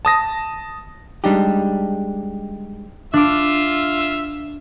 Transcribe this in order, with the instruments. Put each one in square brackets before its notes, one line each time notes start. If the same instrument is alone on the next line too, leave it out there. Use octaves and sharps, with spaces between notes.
[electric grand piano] A5 D#6 A#6
[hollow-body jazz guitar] G3 G#3 D4 D#4 G4
[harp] D4 D6 [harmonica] F4 E5